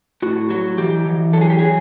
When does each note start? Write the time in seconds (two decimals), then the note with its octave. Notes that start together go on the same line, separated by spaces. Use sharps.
0.22 A2 F#4
0.50 F#3 F#4
0.78 E3 G4
1.06 E3
1.33 F#3 A4
1.41 G#4
1.50 G4
1.59 F#3 G#4